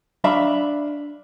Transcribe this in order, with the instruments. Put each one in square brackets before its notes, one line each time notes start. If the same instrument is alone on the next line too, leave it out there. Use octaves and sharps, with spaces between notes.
[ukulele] D4 E5 F5 B5